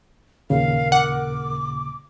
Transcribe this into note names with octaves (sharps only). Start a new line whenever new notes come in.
D#2 A#2 C#3 A#4 F5
F#5 D6